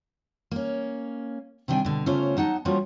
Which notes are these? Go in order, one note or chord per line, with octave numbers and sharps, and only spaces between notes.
A#3 C#4
C3 D#3 G3 D4 G5 G#5
B2 D3
C#3 A3 C#4 F4 C5
F#3 D#4 F#5 A5
F3 G3 A#3 C#4 F4 F#4